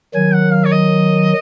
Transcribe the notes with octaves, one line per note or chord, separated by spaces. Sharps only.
D#3 F#3 G#5
F#5
F5
C#5
D#5